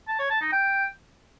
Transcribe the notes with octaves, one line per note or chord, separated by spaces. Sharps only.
A5
C#5
A5
D#4
G5